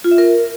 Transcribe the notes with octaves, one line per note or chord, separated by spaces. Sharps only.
F4
E5
A#4